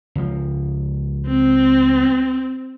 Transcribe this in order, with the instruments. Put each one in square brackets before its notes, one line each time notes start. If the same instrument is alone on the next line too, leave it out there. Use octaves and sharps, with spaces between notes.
[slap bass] C#2 F3
[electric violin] C4